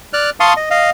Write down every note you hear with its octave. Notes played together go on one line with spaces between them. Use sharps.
D5 F6 F#6
F5 A5 C6 C#6 D#6
D#5
D#5 F5